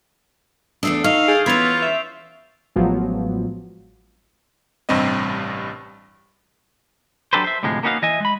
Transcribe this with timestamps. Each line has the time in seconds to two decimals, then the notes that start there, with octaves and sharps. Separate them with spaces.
0.83 E2 A3 D4 D#6 E6 C7
1.04 D#4 F5 C#6 G7
1.28 G#4 G6 A6 D7
1.46 E3 B3 C#4 F4 B5 G#6 D7 F7
1.82 E5
2.76 A1 F3 F#3 G#3 B3
4.89 A1 G2 C3 G3 C4 D#5
7.33 F#3 D4 G4 A4 B4 C5
7.44 C5 E5
7.63 D2 A2 C3 F3 G#3
7.83 A#3 B3 C#4 D#4 F#4 F5
8.02 E3 D#5 E5 G#5
8.20 G#3 B5